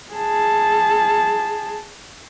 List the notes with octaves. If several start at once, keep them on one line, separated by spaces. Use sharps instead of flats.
G#4 A5